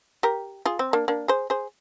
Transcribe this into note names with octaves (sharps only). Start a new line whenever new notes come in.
G4 A#4
F4 G#4
C4
A#3 D4
A#3 D4
G#4 C5
G#4 C5